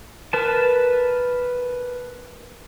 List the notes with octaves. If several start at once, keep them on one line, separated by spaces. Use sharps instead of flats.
A#4 B4 A5